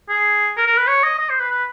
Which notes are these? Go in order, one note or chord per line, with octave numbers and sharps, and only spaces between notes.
G#4
A#4
A#4
B4
C#5
D#5
D#5
C5
B4
B4